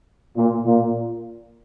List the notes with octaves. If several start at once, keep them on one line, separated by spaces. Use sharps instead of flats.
A#2
A#2